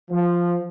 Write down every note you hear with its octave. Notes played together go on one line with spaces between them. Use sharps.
F3